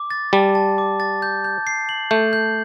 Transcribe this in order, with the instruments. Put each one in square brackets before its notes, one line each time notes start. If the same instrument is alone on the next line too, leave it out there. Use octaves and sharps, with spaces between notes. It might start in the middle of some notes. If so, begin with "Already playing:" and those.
Already playing: [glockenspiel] D6
A6
[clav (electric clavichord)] G3 [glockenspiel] A5
[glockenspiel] A5
D6
A6
G6
G6
C7
F#7
[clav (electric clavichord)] A3 [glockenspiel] G6
[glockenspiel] G6